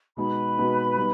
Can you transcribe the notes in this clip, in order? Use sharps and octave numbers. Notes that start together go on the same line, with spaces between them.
B2 G#3 B3 D#4 B4 B5
B2 G#3 B3 D#4
G3 B3 D#4